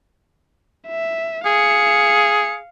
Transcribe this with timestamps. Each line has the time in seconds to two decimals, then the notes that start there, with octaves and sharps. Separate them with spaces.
0.88 E5
1.46 G#4 F5 C#7